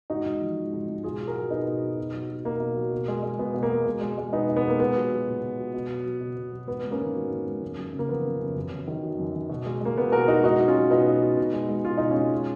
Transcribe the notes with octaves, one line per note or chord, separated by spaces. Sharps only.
G#2 D#4 F#4
G#2
F3
G#3
G#2
G#2
B2 F4 G#4
F#3
F#4 A#4
F#3
B2 B3 D#4
B2
F#3
B2
F#3
F#3
B2 A#3
B2
F#3
B2
G#3
G#3
B2 B3
B2
A#3
G#3
B2
G#3
G#3
B2 B3 D#4
B2
B3
G#3 A#3
A#2 B3
F#3
F#3
A#2
A#2
F#3
B2
F#3
F#3
B2
B2
F#3
G#2 B3
G#2
A#3 C#4
D#3
F#3
G#2
G#2
F#2
F#2
C#3
A#3
F3 B3
F#2
F#2
F#2
F#2
D#3
F#3
F#2
F#2
B2
G#3
G#3 A#3
B2 B3
B2 F#4 A#4
G#3 D#4 F#4
B2 D#4 F#4
F#3
C#4 F4
F#3
B2 B3 D#4
B2
F#3
B2
G#3
G#3
B2 F4
B2 D#4
C#4 F4
G#3
B2